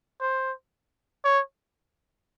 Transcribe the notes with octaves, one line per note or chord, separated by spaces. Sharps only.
C5
C#5